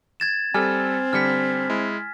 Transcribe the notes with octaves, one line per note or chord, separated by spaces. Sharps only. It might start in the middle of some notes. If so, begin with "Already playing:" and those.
G#6 A6 E7
G3 C4 G4 A4 G#5 F6
D3 G3 F6 B6 C#7
G#3 E4